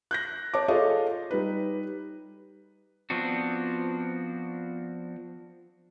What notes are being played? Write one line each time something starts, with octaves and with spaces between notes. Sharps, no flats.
F#6 G6 A#6
C#5 A5 D6
F4 G#4 A4 C#5 D#5 F5
G3 D#4 B4
F3 B3 C4 D4 F#4